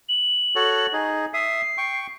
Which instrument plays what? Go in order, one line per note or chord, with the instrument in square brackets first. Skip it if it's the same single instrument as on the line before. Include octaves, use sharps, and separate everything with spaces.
[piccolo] F#7
[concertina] F#4 A4 C#5
D#4 G#4
[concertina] E5 D#6 [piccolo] C7
[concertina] G5 C#6